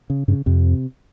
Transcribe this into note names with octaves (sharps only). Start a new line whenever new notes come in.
C#3
G2 C#3
F2 C3